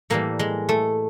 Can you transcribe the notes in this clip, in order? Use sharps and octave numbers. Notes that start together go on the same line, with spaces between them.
A2 E3 G3 A#3
G#3
A3